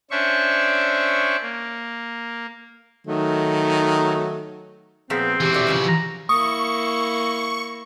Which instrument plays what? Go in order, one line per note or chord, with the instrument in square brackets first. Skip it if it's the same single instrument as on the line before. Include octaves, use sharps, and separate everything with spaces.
[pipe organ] C#4 D4 C5 E5 C#6
A#3
[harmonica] D#3 F#3 A3
[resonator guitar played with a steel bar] A#2 F3 B3 [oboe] C4 [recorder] G#4
[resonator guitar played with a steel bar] E2 [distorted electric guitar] E3 F#4 [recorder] G4
[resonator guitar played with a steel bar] F#3 A3 D5
G#2 C#3 F3
[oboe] A#5
[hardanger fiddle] A#3 E4 [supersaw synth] C#6 [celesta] D#6